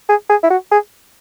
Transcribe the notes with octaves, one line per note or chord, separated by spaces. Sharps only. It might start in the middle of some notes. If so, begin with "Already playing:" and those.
G#4
G#4
E4
F#4
G#4